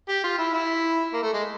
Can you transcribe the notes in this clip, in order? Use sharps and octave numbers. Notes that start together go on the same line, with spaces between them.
G4
F4
E4
E4
A#3
A3
G#3